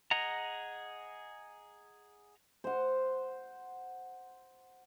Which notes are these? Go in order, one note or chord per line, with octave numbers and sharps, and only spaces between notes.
G#4 D#5 F#5 A#5
C5 F#5